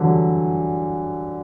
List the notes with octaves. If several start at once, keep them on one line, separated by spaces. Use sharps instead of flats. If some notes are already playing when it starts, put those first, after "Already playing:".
Already playing: D3 E3 F#3 G3